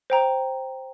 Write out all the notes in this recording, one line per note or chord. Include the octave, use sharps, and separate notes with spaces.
C5 G5 A#5